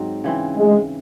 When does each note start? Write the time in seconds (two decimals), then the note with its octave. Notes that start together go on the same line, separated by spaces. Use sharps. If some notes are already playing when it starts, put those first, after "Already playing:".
Already playing: G#2 F#3 C4
0.24 C#3 E3 C4
0.57 G#3